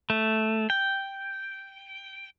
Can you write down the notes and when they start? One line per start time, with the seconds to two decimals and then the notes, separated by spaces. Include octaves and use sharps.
0.10 A3
0.70 G5